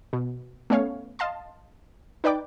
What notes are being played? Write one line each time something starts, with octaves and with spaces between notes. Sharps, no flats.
B2
A3 B3 C#4 C#5 F5
D#5 F5 A5 C6
D#4 B4 D5 G5 D6